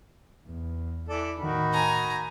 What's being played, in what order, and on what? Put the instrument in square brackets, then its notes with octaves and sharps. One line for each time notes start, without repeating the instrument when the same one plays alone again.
[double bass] E2
[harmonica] E3 A4 D5
[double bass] A2 D#3 [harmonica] D#4 F#4 B5
[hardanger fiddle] G#5 A#5